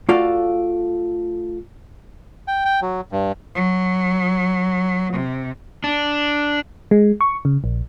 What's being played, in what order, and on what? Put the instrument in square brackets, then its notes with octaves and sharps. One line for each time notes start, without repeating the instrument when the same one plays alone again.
[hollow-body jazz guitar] A3 F4 F#4 A4 D5 F5
[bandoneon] G5
G5
F#3
G2
[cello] F#3
C3
[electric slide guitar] D4
[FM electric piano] G#3
C#6
C#3
A#1